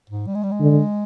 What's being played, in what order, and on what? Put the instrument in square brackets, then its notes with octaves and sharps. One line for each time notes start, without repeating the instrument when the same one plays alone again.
[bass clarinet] G#2
G3
G#3
G3
G#3
[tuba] D3